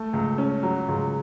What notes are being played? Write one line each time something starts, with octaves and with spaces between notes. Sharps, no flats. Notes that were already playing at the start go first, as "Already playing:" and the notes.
Already playing: A3
C#2
C#4
F#3
C#2